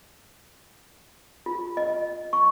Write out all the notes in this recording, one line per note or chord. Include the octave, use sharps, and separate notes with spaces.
F4
D#5
C#6